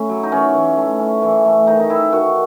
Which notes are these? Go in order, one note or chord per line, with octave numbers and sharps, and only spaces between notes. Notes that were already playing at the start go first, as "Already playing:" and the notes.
Already playing: A2 C#4 E4
F#3
D#4
E3 C#4
E3
A3
C#4
E3
A3
D#3 D#4
D#4
D#3 E4
D#3 F#4